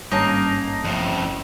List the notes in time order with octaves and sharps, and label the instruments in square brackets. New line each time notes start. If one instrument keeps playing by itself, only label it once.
[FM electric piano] G#1 G2 C#4 [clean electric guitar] A#3 D#4 [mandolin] D#5 F5 A5
[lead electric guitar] F2 A2